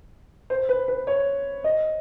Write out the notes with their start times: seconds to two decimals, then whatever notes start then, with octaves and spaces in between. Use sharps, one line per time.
0.50 C5
0.69 B4
0.88 B4
1.07 C#5
1.64 D#5